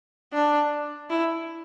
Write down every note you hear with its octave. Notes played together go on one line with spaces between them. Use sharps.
D4
E4